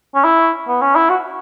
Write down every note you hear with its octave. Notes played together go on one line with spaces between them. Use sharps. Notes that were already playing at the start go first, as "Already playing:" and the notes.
C#4
E4
B3
C#4
E4
F#4